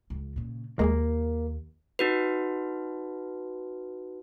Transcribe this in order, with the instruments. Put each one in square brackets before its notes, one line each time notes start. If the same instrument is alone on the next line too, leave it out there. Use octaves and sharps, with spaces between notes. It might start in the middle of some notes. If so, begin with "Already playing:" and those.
[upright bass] C#2
A#2 C#3
[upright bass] D#2 [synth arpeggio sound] G#3 G#4 G#5 [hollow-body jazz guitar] A#3
[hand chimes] D#4 F#4 B4